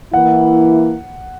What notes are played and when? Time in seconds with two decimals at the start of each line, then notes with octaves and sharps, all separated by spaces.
0.13 E3 A#3 E4 F#5